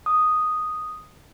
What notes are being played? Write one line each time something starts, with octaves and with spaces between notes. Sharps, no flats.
D#6